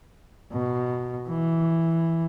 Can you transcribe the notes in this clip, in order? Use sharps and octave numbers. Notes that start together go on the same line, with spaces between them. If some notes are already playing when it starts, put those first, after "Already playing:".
B2
E3